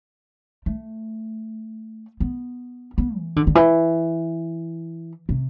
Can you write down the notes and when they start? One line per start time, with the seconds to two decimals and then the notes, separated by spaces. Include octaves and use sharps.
0.66 A3
2.20 B3
2.98 B3
3.17 E3
3.36 D3
3.47 D3
3.55 E3
5.29 C3